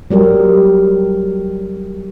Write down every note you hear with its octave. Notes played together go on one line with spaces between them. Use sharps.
F#3 G3 G4 A#4